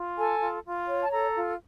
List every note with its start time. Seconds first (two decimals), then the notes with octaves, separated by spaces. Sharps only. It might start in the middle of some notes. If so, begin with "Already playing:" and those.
Already playing: F4
0.17 A4 G#5
0.40 F4
0.64 F4
0.87 C#5
1.01 A5
1.11 A4 A#5
1.35 F4